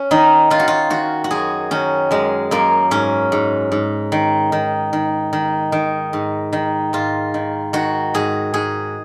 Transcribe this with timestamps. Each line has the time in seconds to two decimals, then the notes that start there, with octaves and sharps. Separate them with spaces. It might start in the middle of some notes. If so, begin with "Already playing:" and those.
Already playing: C#4
0.11 D#3 D#4
0.50 D#3 F4
0.60 F#4
0.68 F4
0.90 D#3 F#4
1.24 F#4
1.31 F#2 G#4
1.71 D#3 C#4
2.11 F#2 G#3
2.51 F#2 A#3
2.91 G#2 C#4
3.32 G#2
3.72 G#2
4.12 D#3
4.52 D#3
4.93 D#3
5.33 D#3
5.72 D#3
6.13 G#2
6.53 D#3
6.93 G#2 F4
7.34 D#3
7.73 D#3 F#4
8.14 G#2 G#4
8.54 G#2 G#4